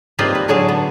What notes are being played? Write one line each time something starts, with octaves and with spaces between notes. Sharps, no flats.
G3 A#3 C4 D#4 F4 B4
B4
A2 D3 F#3 G#4 G#5 A5
B3